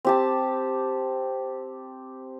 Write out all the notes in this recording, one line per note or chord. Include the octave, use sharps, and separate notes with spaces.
C4 G4 A5